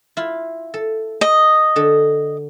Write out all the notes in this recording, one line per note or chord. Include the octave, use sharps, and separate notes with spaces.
E4 F4
A4
D#5
D3 A4